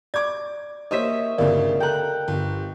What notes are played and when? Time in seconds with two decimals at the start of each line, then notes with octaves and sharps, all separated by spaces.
0.14 D5 D6 G#6
0.91 A#3 C5 C#5 D#5 E5 B6
1.38 G1 D2 C#3 A#4 D5 F5
1.80 A4 G5 A#5 F#6
2.28 G1